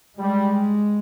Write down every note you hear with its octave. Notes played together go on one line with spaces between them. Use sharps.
G3 G#3